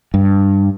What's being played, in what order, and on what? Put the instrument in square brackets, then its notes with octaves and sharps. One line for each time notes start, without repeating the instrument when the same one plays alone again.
[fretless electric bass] G2